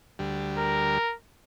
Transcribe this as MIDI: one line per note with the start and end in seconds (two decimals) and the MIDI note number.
0.19 0.98 38
0.19 0.98 55
0.58 1.14 70